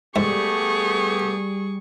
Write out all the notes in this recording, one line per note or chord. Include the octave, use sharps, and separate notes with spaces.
G#2 G3 A3 B3 G4 G#4 C#6